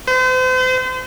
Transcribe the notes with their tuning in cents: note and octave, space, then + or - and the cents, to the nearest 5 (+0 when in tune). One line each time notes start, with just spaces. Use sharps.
C5 -40